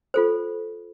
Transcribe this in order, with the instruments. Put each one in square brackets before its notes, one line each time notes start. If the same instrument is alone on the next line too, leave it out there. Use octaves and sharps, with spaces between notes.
[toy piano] F4 A4 C5